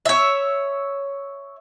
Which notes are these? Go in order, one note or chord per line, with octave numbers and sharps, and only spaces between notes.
C#5 E5